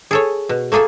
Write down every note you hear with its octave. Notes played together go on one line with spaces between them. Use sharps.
G#4 A4 C#5
B2
A3 A#3 G#4 A4 G#5